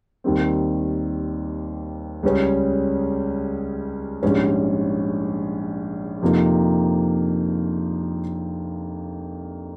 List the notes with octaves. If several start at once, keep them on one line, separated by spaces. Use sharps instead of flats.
D#2 D#3 G3 C4
C#2 C#3 G3 C#4 G#4
A#1 G#2 G3 C#4
F2 C3 F3 A#3 D#4